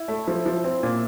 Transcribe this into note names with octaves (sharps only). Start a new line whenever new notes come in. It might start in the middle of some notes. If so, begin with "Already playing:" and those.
Already playing: E4
A3
F3
F3
C4
A#2